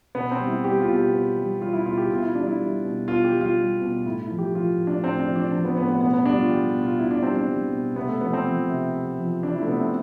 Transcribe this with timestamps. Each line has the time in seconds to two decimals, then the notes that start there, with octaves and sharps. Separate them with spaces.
0.15 B2 B3
0.31 C4
0.39 G3
0.48 E4
0.64 G3 G4
0.80 F4
0.88 B2
0.96 G4
1.13 B2
1.37 G3
1.61 G3 F4
1.73 E4
1.86 B2 F4
1.98 G4
2.10 B2 F4
2.22 E4
2.35 G3 D4
2.47 E4
2.59 G3
2.84 B2
3.08 B2 F4
3.24 G4
3.32 G3
3.41 F4
3.57 G3
3.81 B2
4.06 A2 E4
4.23 E4
4.30 F3
4.39 G4
4.54 F3 F4
4.79 A2
4.87 D4
5.03 A2 C4
5.19 D4
5.28 F3
5.36 D4
5.52 F3 C4
5.65 B3
5.76 A2 B3
5.89 B3
6.01 B2 B3
6.13 B3
6.26 G3 D4
6.38 F4
6.49 G3 G4
6.74 B2
6.83 F4
6.99 B2 E4
7.11 D4
7.23 G3 C4
7.35 D4
7.48 G3
7.72 B2
7.96 C3 B3
8.09 A3
8.21 F3 B3
8.33 C4
8.46 F3
8.69 C3
8.95 C3
9.19 F3
9.43 F3 D4
9.55 E4
9.62 A3
9.67 C3 B3
9.80 C4